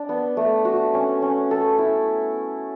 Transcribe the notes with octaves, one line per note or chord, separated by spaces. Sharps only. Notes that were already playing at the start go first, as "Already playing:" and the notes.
Already playing: D4
B3
A3
F#4
C#4
C#4
A4
E4